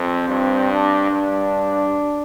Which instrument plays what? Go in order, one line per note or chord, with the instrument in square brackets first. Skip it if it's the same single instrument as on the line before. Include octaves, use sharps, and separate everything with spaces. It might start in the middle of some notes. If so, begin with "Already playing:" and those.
Already playing: [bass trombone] F2 [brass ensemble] C4
[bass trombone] G2
[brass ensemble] D4
[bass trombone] G2